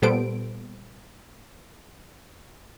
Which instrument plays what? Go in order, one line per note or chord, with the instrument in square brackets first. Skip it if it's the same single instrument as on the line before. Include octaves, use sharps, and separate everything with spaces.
[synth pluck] A#2 G3 B3 A4 C5 D7